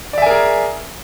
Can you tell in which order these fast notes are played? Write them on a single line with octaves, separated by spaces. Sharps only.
D5 E5 G#5 A#4 G#4